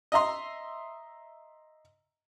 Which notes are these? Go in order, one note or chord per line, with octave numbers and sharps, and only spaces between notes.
D#5 E5 A#5 C6